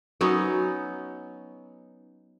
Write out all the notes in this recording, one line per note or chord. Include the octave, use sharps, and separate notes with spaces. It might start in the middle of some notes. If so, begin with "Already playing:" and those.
F#3 B3 C#4 D#4